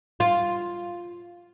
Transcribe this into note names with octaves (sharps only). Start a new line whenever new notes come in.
F4